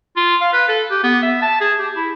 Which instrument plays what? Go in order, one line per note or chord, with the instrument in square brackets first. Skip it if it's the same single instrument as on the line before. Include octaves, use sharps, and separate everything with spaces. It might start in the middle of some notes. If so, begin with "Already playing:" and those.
[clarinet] F4
F5
B4
A4
G4
B3
E5
A5
G#4
G4
E4